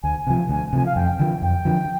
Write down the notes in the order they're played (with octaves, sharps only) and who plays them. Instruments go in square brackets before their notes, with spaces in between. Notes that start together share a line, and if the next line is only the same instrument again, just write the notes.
[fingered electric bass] D2 [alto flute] G#5
[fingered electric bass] C3 F3 [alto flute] G#5
[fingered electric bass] D2 [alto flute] G#5
[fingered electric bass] C3 F3 [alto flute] G#5
[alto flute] F5
[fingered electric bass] F2 [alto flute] G5
[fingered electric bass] D3 F3
[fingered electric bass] F2 [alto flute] G5
[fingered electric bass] D3 F3